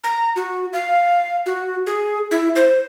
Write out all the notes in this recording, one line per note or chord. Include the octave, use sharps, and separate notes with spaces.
A#5
F#4
F5
F#4
G#4
E4
C5